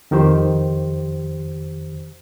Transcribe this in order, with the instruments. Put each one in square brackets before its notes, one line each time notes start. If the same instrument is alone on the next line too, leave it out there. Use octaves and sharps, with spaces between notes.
[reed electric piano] F2 D#3 G4 C5